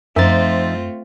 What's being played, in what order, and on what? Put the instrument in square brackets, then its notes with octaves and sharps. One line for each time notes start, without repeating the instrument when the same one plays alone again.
[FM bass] F#2 [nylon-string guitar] F3 D#4 [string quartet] A3 C4 F4 [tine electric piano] E5 A6